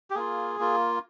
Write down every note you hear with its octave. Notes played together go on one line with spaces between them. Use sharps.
G4
A#3 F4 G#4
A#3 F4